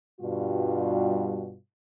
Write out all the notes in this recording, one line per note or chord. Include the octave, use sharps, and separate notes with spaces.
G2 B2 G3 F4 F#4